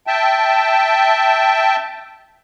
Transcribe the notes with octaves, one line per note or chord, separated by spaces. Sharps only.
E5 G5 A5